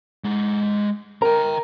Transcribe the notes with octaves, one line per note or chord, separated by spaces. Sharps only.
G#3 F#5
A#4 G5 A#5